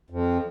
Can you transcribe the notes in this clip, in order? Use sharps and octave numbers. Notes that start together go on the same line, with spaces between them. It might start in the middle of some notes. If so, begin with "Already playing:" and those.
F2